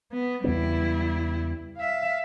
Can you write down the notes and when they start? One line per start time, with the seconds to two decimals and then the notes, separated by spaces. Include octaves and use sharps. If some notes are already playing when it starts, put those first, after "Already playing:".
0.12 B3
0.44 E2 C#3 G3 B3 E4
1.77 E5 F5